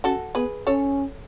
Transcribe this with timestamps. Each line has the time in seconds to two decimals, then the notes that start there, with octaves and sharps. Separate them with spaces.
0.04 C#4 F#4 A4
0.35 B3 G#4 B4
0.67 C#4 A4 C#5